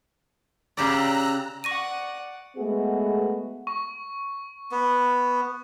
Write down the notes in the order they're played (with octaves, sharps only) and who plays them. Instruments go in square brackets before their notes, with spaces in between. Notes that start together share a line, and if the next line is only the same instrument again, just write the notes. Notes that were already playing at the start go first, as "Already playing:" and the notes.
[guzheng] C#3 G4 D5 [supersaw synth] A#5 E6 F#6
[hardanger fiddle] D5 F#5 [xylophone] C#6 A#6 D#7
[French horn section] G#3 A3 B3 F#4 G#4
[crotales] C#6
[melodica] B3